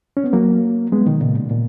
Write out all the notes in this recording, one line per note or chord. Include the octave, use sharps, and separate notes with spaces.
C#4
B3
F#3 A#3
G#3 B3
B2 D#3
A#2 C#3
B2
A#2